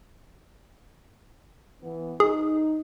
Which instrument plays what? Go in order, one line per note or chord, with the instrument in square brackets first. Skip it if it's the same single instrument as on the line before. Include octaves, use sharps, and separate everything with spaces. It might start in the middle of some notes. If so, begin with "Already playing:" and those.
[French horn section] E3 B3
[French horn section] D#4 [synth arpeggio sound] G#4